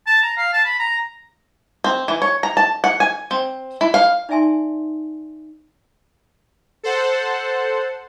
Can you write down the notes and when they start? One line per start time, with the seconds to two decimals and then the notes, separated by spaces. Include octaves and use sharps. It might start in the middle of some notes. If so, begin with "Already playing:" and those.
0.07 A5
0.22 A#5
0.37 F5
0.53 A5
0.65 B5
0.79 A#5
1.84 C4
2.08 E3
2.22 C#5
2.43 A#5
2.57 A5
2.84 F#5
3.00 G#5
3.31 C4
3.81 E4
3.94 F5
4.29 D#4 D5 E5 G#5 A5 C6
6.83 A4 C5 F#5